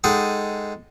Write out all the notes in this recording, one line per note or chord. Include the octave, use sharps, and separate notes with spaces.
G#3 D#4 G#4 A4 F#5 G5